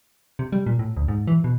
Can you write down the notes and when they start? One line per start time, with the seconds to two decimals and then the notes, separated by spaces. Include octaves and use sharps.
0.39 C3
0.52 G3
0.66 A#2
0.79 A2
0.97 D2
1.08 G#2
1.27 E3
1.44 B2